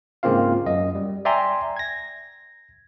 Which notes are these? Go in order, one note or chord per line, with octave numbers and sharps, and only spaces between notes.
G#2 C#3 A#3 C4 F4 F5
F#2 D#5
G3
D5 E5 G5 G#5 A#5 C6
G#6 A#6